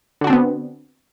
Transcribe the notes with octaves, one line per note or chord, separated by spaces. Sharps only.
D3 B3 C4 D4 F#4